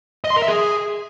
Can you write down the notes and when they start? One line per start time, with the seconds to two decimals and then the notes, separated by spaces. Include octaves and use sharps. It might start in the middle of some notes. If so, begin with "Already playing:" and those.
0.24 D#5
0.30 C6
0.36 A#4
0.42 E5
0.48 G#4